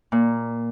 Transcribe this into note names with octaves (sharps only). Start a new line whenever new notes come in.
A#2